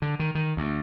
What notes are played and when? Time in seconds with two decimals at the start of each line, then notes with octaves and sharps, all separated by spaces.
0.02 D3
0.19 D#3
0.35 D#3
0.57 D2